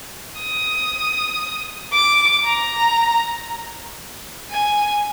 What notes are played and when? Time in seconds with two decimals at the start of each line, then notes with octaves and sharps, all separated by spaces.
0.39 D#6
1.93 D6
2.45 A#5
4.51 G#5